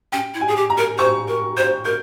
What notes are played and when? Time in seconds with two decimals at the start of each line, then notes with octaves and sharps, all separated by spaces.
0.12 C#4 G5
0.34 E4
0.41 G#5
0.48 G#4
0.56 G4
0.70 A#5
0.78 A#4
0.98 C5 C#6
1.28 A#4
1.57 C5 G6
1.85 A#4 G6